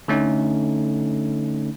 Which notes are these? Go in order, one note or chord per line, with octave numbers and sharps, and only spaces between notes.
D3 A3 C#4 D#4